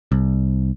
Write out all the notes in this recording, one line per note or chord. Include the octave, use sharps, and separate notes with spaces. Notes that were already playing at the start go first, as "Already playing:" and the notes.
C2